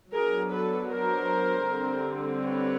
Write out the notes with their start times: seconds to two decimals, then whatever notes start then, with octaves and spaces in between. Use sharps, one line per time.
0.12 F#3 B3 D4 G#4 A#4
0.51 A4 B4
0.90 A#4 C5
1.68 D3 G3 C4
2.46 B4 C#5